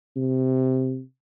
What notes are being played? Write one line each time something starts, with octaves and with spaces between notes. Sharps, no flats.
C3